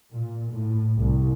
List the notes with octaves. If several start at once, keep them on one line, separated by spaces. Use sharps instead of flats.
A#2
A2
C2